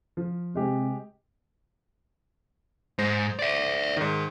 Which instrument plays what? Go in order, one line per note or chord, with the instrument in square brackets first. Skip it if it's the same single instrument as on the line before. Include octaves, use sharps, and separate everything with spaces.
[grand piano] F3
[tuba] C3 [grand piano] G#3 G4
[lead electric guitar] G#2 [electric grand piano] C5 A#6
[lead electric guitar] D5 E5
[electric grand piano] G#2 D#3